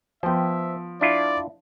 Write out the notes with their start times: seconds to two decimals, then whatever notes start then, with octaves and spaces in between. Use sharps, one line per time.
0.23 F3 B3 C5 E5 G5
1.01 D4 E4 F4 D5